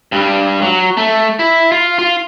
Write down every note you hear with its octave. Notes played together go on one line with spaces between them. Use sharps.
G2 G3
F#3
A3
E4
F4
F4